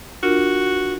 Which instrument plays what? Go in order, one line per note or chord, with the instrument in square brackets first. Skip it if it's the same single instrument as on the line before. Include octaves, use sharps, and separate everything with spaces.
[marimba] D4 F4 A#4 [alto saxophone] F#4